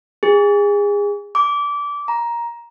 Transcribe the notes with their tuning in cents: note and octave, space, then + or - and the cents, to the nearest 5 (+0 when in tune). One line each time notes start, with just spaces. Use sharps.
G#4 -30
D6 -20
A#5 +15